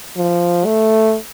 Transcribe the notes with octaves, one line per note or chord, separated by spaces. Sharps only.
F3
A3